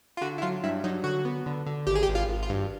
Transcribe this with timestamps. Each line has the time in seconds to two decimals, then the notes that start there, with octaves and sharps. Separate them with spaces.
0.17 F4
0.21 D3 F#4
0.38 E4
0.42 F#3 F4
0.63 G2 E4
0.84 F#3 D#4
1.04 D3 F#4
1.25 B3
1.46 D3
1.66 D3
1.87 G#1 G4
1.95 G#4
2.03 G4
2.08 G#1
2.15 F4
2.29 G#1
2.43 F4
2.49 G2